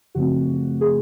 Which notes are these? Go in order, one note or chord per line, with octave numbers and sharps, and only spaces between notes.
F#2 C#3 F3 A3 C4 F#4
G#4